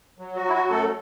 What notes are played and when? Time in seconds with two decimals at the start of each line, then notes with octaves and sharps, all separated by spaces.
0.18 F#3
0.36 F#4
0.41 F#3
0.49 E4
0.53 F#4
0.65 F#2
0.71 A3 A4